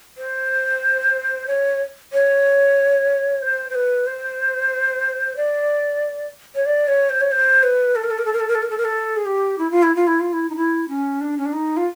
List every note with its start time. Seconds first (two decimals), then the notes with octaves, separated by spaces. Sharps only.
0.18 C5
1.47 C#5
2.13 C#5
3.42 C5
3.70 C5
3.75 B4
4.07 C5
5.36 D5
6.55 C#5
6.66 D5
6.88 C#5
7.10 C5
7.21 C#5
7.32 C5
7.63 B4
7.96 A4
8.04 A#4
8.11 A4
8.18 A#4
8.25 A4
8.33 A#4
8.40 A4
8.48 A#4
8.55 A4
8.62 A#4
8.70 A4
8.78 A#4
8.85 A4
9.16 G#4
9.26 G4
9.58 E4
9.71 F4
9.83 E4
9.95 F4
10.07 E4
10.20 F4
10.33 E4
10.50 D#4
10.56 E4
10.89 C#4
11.21 D4
11.38 C#4
11.45 D4
11.53 D#4
11.77 F4